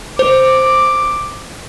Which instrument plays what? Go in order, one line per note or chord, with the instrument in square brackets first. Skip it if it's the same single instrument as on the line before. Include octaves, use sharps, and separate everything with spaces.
[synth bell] C5 [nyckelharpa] D6